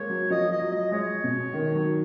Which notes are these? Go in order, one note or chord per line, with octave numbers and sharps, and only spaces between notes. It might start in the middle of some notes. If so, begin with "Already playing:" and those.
Already playing: G#3 A#3 C#5
F#3
F3 D#5
D#5
F#3
D#5
G#3 C#5
B2
D#3
F#3